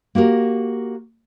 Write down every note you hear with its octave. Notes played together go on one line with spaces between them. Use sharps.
A#3 F#4 G4 A#4